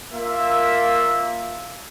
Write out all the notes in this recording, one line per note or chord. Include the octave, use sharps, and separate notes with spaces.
A#3 F4 E5